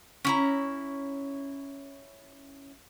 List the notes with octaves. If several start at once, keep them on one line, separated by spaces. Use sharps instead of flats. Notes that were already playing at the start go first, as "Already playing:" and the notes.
C#4 E4 A#5